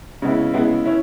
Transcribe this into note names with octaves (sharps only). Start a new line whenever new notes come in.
C#3 G#3 B3 E4
C#3 G#3 B3 E4
C#4 E4